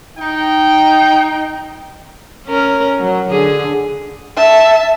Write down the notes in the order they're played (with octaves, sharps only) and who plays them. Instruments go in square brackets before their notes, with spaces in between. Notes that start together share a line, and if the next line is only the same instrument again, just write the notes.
[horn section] D#4 G5
[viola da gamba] C#4 A#4
F#3
D3 G#4
[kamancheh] E5 A5